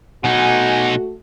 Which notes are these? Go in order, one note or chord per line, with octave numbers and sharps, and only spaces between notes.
B2 A3 D#4 F#4 F#5 G#5